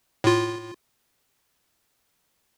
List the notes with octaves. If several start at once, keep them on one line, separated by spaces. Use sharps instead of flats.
A2 F4